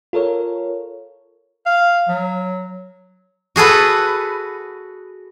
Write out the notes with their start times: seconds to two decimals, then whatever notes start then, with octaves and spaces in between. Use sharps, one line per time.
0.13 F4 A4 A#4 C#5
1.66 F5
2.09 F#3
3.56 F#4 G#4 A4 B4